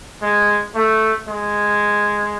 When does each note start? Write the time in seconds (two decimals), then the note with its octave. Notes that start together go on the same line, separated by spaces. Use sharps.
0.22 G#3
0.75 A3
1.28 G#3